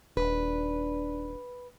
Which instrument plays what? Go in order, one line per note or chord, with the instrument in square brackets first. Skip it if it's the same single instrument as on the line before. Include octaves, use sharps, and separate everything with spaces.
[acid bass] D#1 [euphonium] D4 [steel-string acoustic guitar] B4